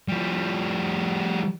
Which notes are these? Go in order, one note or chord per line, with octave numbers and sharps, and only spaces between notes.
F3 G3